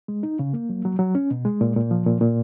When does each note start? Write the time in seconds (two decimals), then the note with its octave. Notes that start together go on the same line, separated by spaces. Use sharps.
0.08 G#3
0.23 D#4
0.39 C#3
0.53 A#3
0.69 F#3
0.85 F#3
0.99 F#3
1.15 C#4
1.31 B2
1.45 G#3
1.61 A#2
1.76 A#2
1.91 F3
2.06 A#2
2.21 A#2